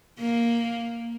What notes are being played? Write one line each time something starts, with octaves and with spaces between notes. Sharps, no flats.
A#3